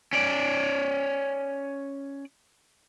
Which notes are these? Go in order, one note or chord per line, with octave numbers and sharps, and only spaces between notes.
C#4 D5